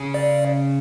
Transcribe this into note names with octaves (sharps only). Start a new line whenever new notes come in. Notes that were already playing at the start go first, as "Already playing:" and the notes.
Already playing: C#3
D5